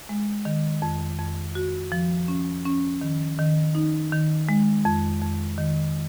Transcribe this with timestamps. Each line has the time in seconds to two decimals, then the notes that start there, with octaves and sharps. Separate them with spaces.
0.09 G#3
0.45 D#3
0.82 F2
1.19 F2
1.55 F#4
1.92 F3
2.28 C#4
2.65 C#4
3.01 D#3
3.39 D#3
3.75 D#4
4.13 D#3
4.49 G#3
4.85 F2
5.22 F2
5.58 D#3